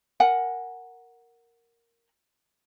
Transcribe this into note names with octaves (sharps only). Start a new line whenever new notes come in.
A#4 F#5 G#5